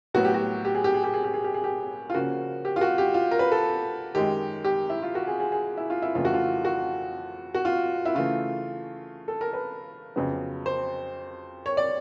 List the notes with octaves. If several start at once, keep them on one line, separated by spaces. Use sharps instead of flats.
A2 F#3 B3 F#4
G4
F#4
G4
G#4
G4
G#4
G4
G#4
G4
G#4
G4
G#4
G4
F4
C#3 F3 A#3 C#4 F#4
G4
F4
F#4
G4
F4
A#4
B4
A4
F#2 D#3 G#3 G4
G4
E4
F4
F#4
G#4
G#4
G#4
E4
F4
E4
F2 C#3 E3 A3 F4
F#4
F4
F#4
F#4
F4
E4
C#3 E3 A3 F4
A4
A#4
B4
F2 C#3 F#3 B3
C5
C#5
D5